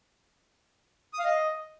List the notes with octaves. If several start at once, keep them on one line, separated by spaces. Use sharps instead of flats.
D#6
F5
D#5